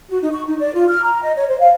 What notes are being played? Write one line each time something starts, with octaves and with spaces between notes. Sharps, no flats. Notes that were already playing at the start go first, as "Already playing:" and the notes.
F#4
D#4
C#6
D#4
D5
F4
F6
A#5
D#5
C#5
C5
F5